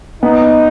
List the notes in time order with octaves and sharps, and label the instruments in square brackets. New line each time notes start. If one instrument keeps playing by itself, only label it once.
[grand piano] B3 [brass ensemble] D#4